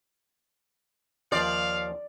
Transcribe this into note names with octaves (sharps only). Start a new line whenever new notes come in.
D#2 F3 D5 F5